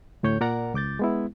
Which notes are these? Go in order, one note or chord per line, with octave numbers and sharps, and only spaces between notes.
D2 A2 C#5 G6
A#2 A#4 D5 F#5 A#5
C#2 D6 G6 A6
G#3 B3 E4